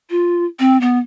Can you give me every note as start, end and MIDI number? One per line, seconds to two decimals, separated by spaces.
0.10 0.45 65
0.60 0.79 60
0.81 0.99 59